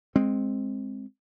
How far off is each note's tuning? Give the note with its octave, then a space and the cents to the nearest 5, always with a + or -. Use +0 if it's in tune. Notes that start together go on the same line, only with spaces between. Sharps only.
G#3 +0 C4 +10